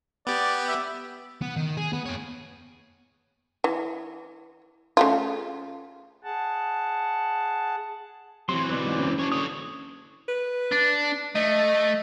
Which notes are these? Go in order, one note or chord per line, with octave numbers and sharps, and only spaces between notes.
B3 G4 D5
E5
B3
D#3
G#4
B3
A#3 C#5
E3
C#3 A3 F4
G#4 F#5 A5
C3 E3 F#3 C6
B2 C4 B4 D5
G#2
F#1
D4 C#5
D3 C#5 D#6
B4
D4
A3 D#5